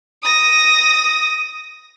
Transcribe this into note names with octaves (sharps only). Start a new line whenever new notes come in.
D#6 A#6